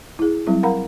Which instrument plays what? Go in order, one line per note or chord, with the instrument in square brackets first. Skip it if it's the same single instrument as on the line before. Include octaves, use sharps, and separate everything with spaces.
[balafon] E4 G#4
F#3 G3 C4 E4
A#4 F5 F#5 A#5 B5